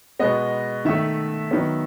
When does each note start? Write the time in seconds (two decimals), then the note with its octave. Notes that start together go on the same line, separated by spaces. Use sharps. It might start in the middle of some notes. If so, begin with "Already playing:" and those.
0.20 B2 G#3 B3 D#5
0.85 D#3 A3 E5
1.51 D#3 F#3 B3